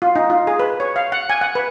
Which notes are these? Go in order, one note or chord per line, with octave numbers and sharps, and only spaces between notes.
F4
D#4
F4
G#4
B4
C#5
F5
F#5
G#5
F#5
B4